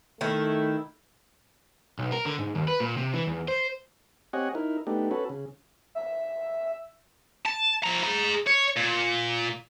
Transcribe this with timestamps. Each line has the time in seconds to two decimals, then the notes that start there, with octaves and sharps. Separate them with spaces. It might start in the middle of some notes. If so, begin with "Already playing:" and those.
0.21 D#3 A3 E4
1.99 B1
2.12 A#4
2.26 D3
2.39 G#2
2.55 D#2
2.68 B4
2.80 A#2
2.97 C3
3.14 E3
3.27 E2
3.48 C5
4.33 C4 G4 C#5 D#5 F#5 G#5
4.55 D#4 E4 A#4
4.87 A3 B3 D4 D#4 G4
5.11 C#4 F#4 A4 B4
5.29 C#3
5.95 E5
7.45 A5
7.83 F3 A#5
8.03 G#4 A#5
8.47 C#5
8.77 A#2